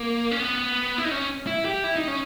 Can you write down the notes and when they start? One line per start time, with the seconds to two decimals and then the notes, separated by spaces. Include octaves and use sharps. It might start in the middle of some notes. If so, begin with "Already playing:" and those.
Already playing: A#3
0.31 C#4
0.40 B3
0.98 E4
1.05 D#4
1.11 C#4
1.47 E4
1.65 G4
1.84 E4
1.96 D#4
2.08 C#4